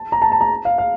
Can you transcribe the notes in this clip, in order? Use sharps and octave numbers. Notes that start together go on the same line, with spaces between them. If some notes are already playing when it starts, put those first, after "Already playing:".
Already playing: A5
A#5
A5
A5
A#5
F5
F5